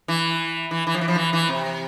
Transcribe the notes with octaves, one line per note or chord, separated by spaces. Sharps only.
E3
E3
E3
F3
E3
F3
E3
E3
C3